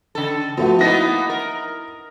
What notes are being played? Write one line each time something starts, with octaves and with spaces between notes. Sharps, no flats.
C#3 A4
F3 A3 B3 F#4
A#3 B3 D#4 E4 A#6
A#4